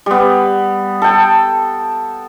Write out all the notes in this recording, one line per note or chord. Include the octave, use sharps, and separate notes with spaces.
G3 B3
A4 G5